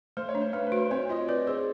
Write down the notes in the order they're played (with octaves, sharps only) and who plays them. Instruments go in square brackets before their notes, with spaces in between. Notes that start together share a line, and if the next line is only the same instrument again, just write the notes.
[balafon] A3 [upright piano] C5
[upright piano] C#5
[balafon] D4
[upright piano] C5
[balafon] A3 [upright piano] B4
[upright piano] B4
[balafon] F#4
[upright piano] C5
[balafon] C4 [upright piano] C#5
[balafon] F4 [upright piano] D#5
[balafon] B4 [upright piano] D5
[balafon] G#4 [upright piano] C5